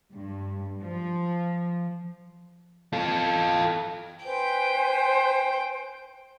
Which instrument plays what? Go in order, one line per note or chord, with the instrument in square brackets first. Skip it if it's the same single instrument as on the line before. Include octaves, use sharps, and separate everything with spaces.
[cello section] G2
F3
[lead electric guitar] F4 A4
[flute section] B4 C5 G#5 [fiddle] G5